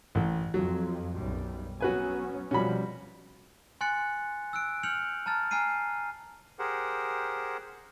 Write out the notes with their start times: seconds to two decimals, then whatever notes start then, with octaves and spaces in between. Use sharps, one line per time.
0.15 A1
0.54 F2 F#3
1.14 B1 F#2 G3
1.81 F#3 B3 C#4 F#4 B4 G#5
2.51 B2 F3 G3 C#4 F#4 B5
3.81 G#5 C6 F#6 A6 C#7
4.53 E6 F#6 D7
4.83 F6 G6 C#7 F7 F#7
5.26 A5 A#5 F6 A6
5.51 G#5 A#5 F6 C7 D#7
6.59 G4 G#4 A#4 C5 F#5